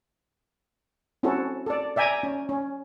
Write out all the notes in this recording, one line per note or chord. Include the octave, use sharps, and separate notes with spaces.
C4 C#4 E4 F#4 A4
A4 D5
D5 E5 G5 G#5 A#5
C#4
C#4